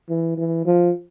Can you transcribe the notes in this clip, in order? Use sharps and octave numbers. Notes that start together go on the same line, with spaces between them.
E3
E3
F3